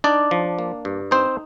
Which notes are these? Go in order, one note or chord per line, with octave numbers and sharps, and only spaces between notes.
D4 D#4 D5
F3
A#3
G2
C4 D#4 C5